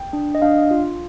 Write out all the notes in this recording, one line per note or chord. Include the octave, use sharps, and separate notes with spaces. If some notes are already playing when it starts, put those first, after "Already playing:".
Already playing: G5
D4
D#5
D4 F5
F4